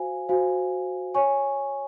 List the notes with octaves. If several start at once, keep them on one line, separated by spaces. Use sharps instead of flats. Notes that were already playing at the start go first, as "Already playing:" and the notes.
Already playing: F#4 C5 F5 G#5
F#4 C5 F5 G#5
C#5 G#5 C#6